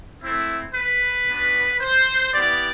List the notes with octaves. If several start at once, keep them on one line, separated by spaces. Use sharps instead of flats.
A3 C4 E4
B4
B3 D4 F#4
C5
B3 E4 G4 D5